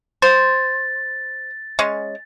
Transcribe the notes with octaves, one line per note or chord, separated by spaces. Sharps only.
C5 A6
G#3 C#4